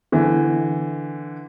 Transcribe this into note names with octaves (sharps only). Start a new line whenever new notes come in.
D3 E3